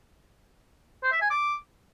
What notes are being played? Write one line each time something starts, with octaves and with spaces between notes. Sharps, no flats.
C5
E5
G#5
D6